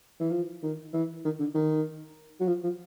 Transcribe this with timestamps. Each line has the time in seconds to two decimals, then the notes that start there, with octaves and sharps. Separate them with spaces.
0.20 E3
0.31 F3
0.63 D#3
0.93 E3
1.25 D#3
1.39 D3
1.55 D#3
2.40 F#3
2.48 F3
2.63 F3